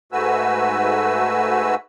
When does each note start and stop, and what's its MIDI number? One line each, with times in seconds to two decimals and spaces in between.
0.12 1.75 44
0.12 1.75 57
0.12 1.75 66
0.12 1.75 71
0.12 1.75 80
0.12 1.75 88